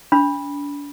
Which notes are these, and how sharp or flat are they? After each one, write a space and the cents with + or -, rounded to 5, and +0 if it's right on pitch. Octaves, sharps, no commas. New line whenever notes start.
D4 -35 B5 -10